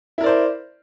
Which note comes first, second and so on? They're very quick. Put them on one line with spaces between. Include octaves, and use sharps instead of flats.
E4 A#4 D5 C5